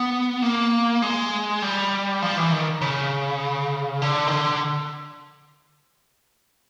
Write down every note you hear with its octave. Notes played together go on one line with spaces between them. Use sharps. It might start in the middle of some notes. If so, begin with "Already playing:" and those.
Already playing: B3
A#3
G#3
G3
F3
E3
D#3
C#3
D3
D#3
D3